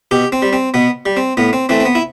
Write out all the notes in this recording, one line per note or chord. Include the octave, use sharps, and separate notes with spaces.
B2 G4
C4
G3
C4
B2 B3
G3
C4
A2 B3
C4
E3 A3 C4
C4
B3
E4